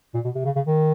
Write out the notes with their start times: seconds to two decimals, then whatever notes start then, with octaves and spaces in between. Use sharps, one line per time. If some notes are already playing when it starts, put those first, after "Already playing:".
0.14 A#2
0.25 B2
0.35 C3
0.45 C#3
0.56 C#3
0.67 D#3